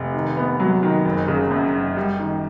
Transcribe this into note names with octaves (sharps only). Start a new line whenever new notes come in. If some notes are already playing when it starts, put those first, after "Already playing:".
Already playing: F1
D#3
B3
F#3
D#3
F#1
C#3
F#2
F#1
G3
D#3